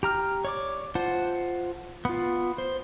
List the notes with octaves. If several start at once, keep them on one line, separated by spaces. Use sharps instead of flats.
G4 A#5 F6
C#5 D5 D6
F4 C5 F#5 A5
B3 F4
C5